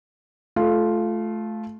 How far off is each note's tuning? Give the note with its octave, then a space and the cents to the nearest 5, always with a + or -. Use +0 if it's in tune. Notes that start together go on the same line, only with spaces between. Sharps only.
A3 -20 F4 +0